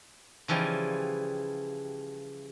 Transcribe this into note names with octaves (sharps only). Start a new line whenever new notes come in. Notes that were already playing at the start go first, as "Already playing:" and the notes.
C#3 E3 F3 G3